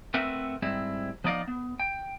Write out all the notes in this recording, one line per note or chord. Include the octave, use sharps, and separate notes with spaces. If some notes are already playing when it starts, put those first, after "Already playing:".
A3 C4 A#4 B4 E5 F#5
G#2 G3 C4 E4
F3 B3 D#4 D5 D#5 F5
B3
G5